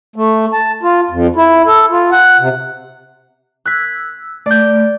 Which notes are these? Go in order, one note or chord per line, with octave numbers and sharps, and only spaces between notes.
A3
A5
F4
F2
E4
A4
F4
F#5
C3
E6 F#6 G#6 B6
A3 D5 G6